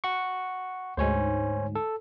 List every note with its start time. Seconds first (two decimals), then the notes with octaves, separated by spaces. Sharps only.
0.04 F#5 C#6
0.97 D2 G#2 C5 C#5 G#5
1.75 A4